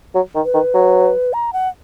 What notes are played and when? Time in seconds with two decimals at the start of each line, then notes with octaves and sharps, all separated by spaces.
0.15 F#3
0.35 D#3
0.45 B4
0.54 D#3
0.74 F#3
1.33 A#5
1.53 F#5